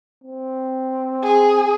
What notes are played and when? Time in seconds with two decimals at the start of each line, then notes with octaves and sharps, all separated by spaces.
0.24 C4
1.22 G#4